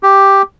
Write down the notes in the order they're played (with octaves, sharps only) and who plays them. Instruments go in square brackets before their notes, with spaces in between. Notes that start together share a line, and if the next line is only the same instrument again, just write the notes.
[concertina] G4